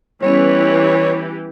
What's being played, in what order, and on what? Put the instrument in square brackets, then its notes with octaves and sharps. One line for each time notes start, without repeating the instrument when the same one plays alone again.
[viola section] E3 G4 [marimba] G3 B3 C#4 [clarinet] C#5